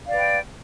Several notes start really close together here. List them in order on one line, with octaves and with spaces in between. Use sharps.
F5 D5 B4 G5